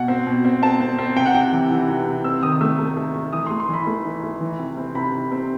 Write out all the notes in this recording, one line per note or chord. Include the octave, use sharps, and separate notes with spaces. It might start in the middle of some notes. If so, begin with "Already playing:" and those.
Already playing: B2 F#5
C4
B2
C4
C4 A5
C4
C4
C3 G5
F#5
C3 G5
E3
E3
C3
C3
C4 E6
D#3 D#6
A3 E6
A3
A3
A3
E3 D#6
A3 C6
C6
E3 B5
A3
E3
A3
E3
C3
C4
C3 B5
C3
C4